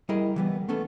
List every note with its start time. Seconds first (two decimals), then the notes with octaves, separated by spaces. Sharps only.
0.09 G3 E4 G#4 A#4 D#5
0.36 E3 G3 B3
0.68 A3 B3 C#4 A4